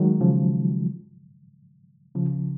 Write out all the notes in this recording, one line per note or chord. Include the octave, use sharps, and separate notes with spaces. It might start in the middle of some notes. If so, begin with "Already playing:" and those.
Already playing: D#3 F#3 G#3
C#3 F3
C#3 F3